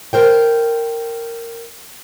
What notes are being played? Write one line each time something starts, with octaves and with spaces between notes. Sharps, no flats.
A#4 C5 G5